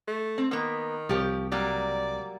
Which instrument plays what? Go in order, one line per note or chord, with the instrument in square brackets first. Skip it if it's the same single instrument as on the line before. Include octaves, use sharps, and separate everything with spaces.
[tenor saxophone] A3
[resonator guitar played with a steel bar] C4
[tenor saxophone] D#3 [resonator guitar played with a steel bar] A#3 B3
[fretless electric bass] C2 [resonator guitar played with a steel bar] F3 G4 C#5
[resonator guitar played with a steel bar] F#3 G3 A#3 [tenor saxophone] D5